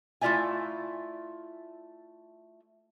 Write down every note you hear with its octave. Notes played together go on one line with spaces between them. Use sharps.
A3 E4 F4 D5 E5 G#5